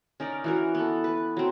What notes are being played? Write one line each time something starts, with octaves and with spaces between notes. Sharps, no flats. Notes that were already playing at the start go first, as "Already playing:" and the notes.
C#4 D#4 A#4 D5
E3 F#4 A#4
B3 A4
B4
F#3 C4